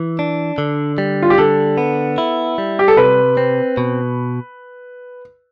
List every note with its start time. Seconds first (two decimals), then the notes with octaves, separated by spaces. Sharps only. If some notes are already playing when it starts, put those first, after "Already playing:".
Already playing: E3
0.19 D4
0.58 D3
0.98 G3
1.23 F4
1.30 G4
1.38 D3 A4
1.78 B3
2.18 E4
2.58 G3
2.79 G4
2.88 A4
2.97 C3 B4
3.37 C4
3.77 B2